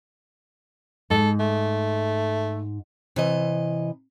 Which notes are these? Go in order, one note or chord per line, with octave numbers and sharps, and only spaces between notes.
G#2 A4
A3
C3 E3 D#5